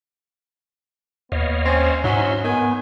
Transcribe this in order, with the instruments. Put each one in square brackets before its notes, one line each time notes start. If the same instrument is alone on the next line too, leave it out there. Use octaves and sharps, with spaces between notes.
[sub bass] D#2 [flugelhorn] B3 [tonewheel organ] C#5 D#5 F5
[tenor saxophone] C4 [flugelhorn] C#4
[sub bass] G#2 [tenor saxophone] F#3 [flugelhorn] C#4 [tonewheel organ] D#4 E5 C6
[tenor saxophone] D#3 [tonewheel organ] B3 [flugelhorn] G#5